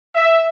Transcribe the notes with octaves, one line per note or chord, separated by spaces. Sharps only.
E5